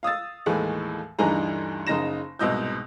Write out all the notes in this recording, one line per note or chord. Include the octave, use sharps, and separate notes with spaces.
F5 D#6 E6 A6
D#2 A2 E3 G#3 A3
D2 G2 E3 D#4 G#4 A#5
F#1 C#3 D#4 A#5 A#6 E7
C2 G#2 B2 D#5 E6 G6